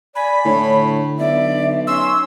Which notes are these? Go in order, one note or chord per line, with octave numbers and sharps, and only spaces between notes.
D5 G#5 B5
A2 D3 C#5
B1 D5 E5
C#4 C6 E6